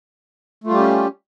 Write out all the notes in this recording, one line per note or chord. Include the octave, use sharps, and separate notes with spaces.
G3 A3 C#4 F4 G4